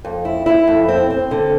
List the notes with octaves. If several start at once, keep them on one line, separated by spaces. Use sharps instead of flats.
F2
E4
E4
F2
C4
C4
D3